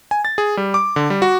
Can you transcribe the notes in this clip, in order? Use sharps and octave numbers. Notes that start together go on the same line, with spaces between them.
G#5
A6
G#4
G3
D6
D3
G3
F#4